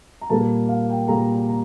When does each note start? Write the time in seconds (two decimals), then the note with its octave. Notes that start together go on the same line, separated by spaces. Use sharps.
0.21 A#5
0.30 A#2 G3 A#3 A5
0.69 F5
0.90 G5
1.08 A#2 G3 A#3 A#5
1.48 A#5